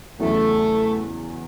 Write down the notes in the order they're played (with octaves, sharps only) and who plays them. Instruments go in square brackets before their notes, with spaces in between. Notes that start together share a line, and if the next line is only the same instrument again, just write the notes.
[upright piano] E2 C#3 F#3 [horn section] A3